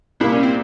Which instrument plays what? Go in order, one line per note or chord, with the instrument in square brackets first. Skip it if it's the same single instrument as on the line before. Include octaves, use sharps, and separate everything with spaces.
[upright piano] C2 A#2 G3 A#3 [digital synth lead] E4
[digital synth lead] C#4
C4